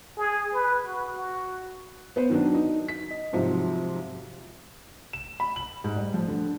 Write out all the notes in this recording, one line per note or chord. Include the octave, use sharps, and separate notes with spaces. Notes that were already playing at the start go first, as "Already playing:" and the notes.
G#4
B4
F#4
F#4
B3 B4 C5
D#3 F#3 D4
D#4
B6
D#5
G#2 C3 F3 F#3
E7
B5
F#7
G#2
G3
F3
D3